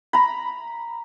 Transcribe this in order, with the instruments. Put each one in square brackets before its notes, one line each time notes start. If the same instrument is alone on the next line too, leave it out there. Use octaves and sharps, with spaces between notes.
[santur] A#5 B5